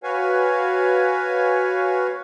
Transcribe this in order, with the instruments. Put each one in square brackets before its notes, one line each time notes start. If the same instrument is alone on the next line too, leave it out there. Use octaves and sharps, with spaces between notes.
[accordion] F#4 B4 C#5 F5 G#5